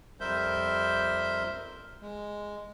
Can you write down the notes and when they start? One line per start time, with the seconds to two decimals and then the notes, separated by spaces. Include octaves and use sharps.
0.20 F2 G3 A#4 C5 E5 G6
2.01 G#3